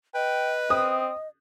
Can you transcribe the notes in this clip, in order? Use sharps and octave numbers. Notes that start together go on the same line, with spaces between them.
B4 D#5 G5
C4 D#6